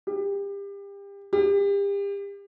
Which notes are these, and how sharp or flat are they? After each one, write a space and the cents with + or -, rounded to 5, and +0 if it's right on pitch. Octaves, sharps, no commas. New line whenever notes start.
G4 +30
G4 +35